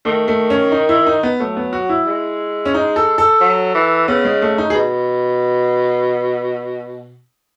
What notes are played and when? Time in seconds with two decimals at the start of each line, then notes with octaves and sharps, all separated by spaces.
0.05 D#3 A3
0.28 A3
0.50 C#4
0.72 D#4
0.89 E4
1.07 D#4
1.23 B3
1.40 F#3 A3
1.56 B3
1.73 F#4
1.89 E4
2.07 G#3
2.65 C#4
2.74 D#4
2.96 A4
3.18 A4
3.41 F#3
3.75 E3
4.08 C#3 B3
4.25 G#3
4.42 A3
4.58 D#4
4.70 G#4
4.75 B2